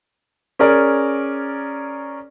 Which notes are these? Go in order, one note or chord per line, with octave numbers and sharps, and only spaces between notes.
C#4 G#4 A#4 D5